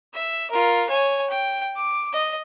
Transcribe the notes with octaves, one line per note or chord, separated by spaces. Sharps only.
E5
F4 A#4
C#5 G#5
G5
D6
D#5